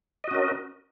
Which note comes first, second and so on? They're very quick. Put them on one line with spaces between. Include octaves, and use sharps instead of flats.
D#5 F#4 C#4 A#4